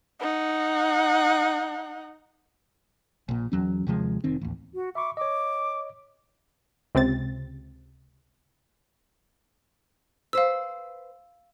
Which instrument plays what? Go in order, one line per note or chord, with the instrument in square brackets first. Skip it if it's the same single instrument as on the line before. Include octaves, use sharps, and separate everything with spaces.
[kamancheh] D#4 F#5
[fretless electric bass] A#1 A#2
E2 F#3 C#4
D#2 C3 F3 G#3
F1 D#3 C4
A1 D#2
[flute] F#4
[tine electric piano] E5 B5 C#6 [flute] D6
[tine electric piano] C#5 D#5 [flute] D6
[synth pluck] C#2 C3 C4 A6
[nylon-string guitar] B4 C5 [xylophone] F5 E6